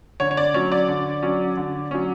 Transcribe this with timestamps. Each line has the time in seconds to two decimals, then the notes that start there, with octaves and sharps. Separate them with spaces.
0.20 D3 C#5
0.31 C#5
0.37 D5
0.54 F#3 C#4 C#5
0.72 D5
0.88 D3
1.23 F#3 C#4
1.57 D3
1.91 F#3 C#4